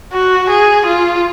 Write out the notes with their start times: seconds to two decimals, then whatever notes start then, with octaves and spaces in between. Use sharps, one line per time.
0.13 F#4
0.49 G#4
0.86 F4